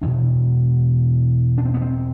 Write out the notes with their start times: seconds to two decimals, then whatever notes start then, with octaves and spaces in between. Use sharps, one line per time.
0.01 E2 B2 D4
1.58 D4
1.65 C4
1.74 B3
1.82 C4